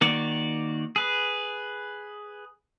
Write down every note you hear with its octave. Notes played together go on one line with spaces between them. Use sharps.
D#3 A#3 F#4 D5
G#4 B4